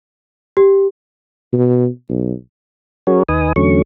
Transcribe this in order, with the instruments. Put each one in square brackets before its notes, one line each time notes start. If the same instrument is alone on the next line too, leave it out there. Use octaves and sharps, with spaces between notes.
[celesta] G4
[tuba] B2
B1
[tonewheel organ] F#3 C#4 F#4 G#4 A#4 C#5
D#2 D#4 B4 G#5 D#6
E2 D3 F#3 A3 C#4 C#6